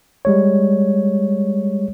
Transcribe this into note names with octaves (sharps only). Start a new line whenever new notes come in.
G3 G#3 C#5